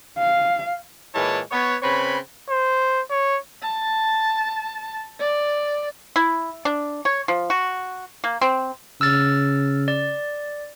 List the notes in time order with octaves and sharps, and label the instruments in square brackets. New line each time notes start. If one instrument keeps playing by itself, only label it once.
[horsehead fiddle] F5
[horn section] A#2 E3 G#3 E4 C#5 A5
B3 C#5
C#3 C4 B4 C#5 B5
[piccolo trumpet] C5
C#5
[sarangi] A5
D5
[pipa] E4
D4
C#5
F3
F#4
A#3
C4
[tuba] C#3 [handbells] E6 F6 A6
[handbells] D5